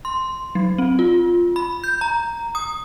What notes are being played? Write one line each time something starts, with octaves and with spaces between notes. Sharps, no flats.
C6
F#3
C4
F4
B5
G6
A#5
D#6